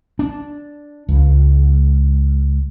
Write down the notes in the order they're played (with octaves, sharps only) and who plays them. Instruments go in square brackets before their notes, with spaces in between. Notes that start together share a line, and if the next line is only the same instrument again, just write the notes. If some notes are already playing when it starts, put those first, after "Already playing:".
[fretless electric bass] D4
C#2